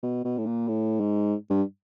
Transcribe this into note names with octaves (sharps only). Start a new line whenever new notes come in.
B2
B2
A2
A#2
A2
G#2
G2